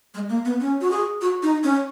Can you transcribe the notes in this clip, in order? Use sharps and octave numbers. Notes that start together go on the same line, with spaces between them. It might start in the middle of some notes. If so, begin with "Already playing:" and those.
G#3
A#3
B3
C#4
F#4
G#4
F#4
D#4
C#4